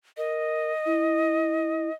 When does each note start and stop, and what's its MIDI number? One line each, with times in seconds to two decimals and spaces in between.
0.17 0.72 70
0.17 1.93 75
0.86 1.89 64